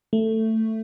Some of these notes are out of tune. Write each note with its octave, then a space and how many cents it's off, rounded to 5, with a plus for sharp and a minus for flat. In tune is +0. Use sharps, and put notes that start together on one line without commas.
A3 +10